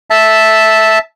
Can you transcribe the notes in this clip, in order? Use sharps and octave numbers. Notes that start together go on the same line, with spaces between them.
E5 A5